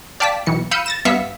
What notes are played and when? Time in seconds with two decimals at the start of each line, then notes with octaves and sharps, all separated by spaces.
0.20 D5 F5 G5 A5 D6 B6
0.46 B1 E3 C#7
0.71 F5 B5 E6 G6 C#7 D#7
0.86 A6 A#6 E7
1.05 G2 B3 E5 F5 B6 C#7